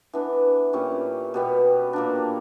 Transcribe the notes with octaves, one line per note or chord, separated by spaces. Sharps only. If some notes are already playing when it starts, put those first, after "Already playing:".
E3 B3 D4
A#2 G3 C#4
B2 G3 B3
A#2 A#3 D4